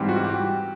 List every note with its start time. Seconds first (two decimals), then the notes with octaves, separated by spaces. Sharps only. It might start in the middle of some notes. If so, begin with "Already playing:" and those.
Already playing: G#2 E3 G3 C4 G4
0.09 F#4
0.24 G4